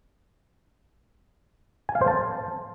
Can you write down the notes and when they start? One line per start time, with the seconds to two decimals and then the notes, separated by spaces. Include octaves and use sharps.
1.89 G#5
1.95 F5
2.01 C5
2.08 A5